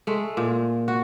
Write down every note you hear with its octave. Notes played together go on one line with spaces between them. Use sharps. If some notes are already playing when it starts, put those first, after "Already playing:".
G#3 A3
A#2
F#4